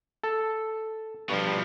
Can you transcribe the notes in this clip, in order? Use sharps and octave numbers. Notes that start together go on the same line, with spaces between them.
A4
G2 B2 F3